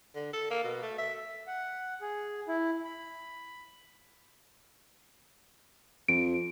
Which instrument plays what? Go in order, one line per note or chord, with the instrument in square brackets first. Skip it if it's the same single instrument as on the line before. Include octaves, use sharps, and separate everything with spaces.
[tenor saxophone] D3
A4
A#3
B2
A3
E5
[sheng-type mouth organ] F#5
G#4
E4
B5
[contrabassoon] F2 [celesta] D7